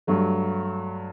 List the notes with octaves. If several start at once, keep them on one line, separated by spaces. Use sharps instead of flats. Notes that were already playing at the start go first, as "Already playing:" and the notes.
G2 F#3 A3